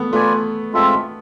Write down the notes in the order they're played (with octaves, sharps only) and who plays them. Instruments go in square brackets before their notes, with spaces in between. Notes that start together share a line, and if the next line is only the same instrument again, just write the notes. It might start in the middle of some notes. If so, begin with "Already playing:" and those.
Already playing: [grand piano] A3 B3
[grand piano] A3 [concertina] F4 B4 D5 G#5
[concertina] G#3 C4 F4 A4 E5